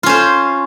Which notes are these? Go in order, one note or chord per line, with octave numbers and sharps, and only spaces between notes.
C#4 F4 C5